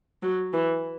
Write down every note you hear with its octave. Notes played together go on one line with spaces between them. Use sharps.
F#3
E3